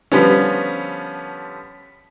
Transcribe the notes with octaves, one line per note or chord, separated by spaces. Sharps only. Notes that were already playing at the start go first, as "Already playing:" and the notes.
D3 F3 G3 B3 C#4